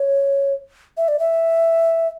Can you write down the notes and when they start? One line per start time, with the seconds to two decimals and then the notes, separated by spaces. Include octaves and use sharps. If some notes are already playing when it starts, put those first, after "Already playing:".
Already playing: C#5
0.97 E5
1.08 D5
1.19 E5